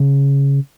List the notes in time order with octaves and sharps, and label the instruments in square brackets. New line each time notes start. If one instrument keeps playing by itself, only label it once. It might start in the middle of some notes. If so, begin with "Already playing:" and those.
Already playing: [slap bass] C#3